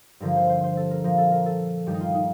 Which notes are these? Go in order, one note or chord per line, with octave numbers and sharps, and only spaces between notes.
G2 D3 F3 A#4
C5
C5
C5
A4
A#4
A#2 F3 A#4
A4
A#4
A4
G2 D#3 G3 G4
D#4
F4
D#4